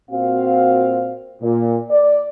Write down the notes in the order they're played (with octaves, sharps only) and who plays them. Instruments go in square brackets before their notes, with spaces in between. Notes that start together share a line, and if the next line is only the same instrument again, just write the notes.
[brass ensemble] A#2 C4 F#4 F5
A#2
D5